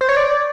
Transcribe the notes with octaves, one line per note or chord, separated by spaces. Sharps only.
C5
C#5
D5